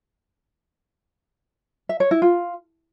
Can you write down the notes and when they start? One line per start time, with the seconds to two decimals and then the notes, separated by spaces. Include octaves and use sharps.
1.89 E5
2.00 C#5
2.11 E4
2.22 F4